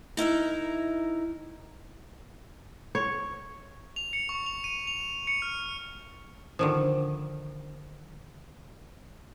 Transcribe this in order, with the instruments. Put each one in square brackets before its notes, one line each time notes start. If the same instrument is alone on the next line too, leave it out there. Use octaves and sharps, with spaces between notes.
[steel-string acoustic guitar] D#4 E4 A#4 E5
[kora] C#5
[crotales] F7
C#7
C#6
F7
D#7
F7
C#7
F6
[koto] D3 D#3 F3